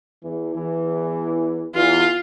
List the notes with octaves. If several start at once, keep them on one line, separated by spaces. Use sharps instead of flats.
E2 E3
E2 E3
E2 E3 F4